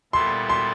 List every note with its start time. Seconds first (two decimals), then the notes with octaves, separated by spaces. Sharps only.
0.13 A#2 G3 B3 E4 A4 C6
0.49 C6